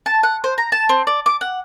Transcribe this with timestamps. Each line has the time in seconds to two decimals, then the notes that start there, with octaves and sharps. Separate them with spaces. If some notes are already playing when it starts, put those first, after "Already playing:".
0.06 A5
0.23 F#5
0.44 C5
0.58 A#5
0.72 A5
0.89 C4
1.07 D5
1.26 D6
1.41 F#5